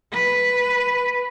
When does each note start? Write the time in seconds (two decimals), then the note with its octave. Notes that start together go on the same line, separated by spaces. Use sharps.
0.12 B4